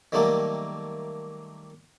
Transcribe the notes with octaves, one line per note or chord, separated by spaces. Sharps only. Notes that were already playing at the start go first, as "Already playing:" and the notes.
D#3 F#3 G3 A3 A#3